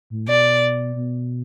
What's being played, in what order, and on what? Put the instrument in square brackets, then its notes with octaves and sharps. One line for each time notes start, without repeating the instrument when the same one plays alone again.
[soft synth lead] A2
[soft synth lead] B2 [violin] D5
[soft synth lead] B2